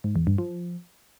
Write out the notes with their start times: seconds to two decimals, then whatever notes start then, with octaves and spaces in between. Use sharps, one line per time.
0.04 G#2
0.16 E2
0.27 G2
0.38 F3